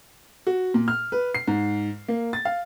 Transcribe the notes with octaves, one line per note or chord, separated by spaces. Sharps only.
F#4
A#2
F6
B4
C7
G#2
A#3
A6
F5